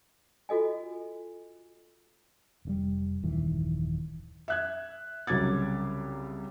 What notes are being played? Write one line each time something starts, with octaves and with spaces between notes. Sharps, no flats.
F4 F#4 A4 D#5 G#5
F1 C#3 G3
D#1 F#2 D#3 E3
E5 F#6 G#6
C2 C#3 F#3 D6 G#6 A6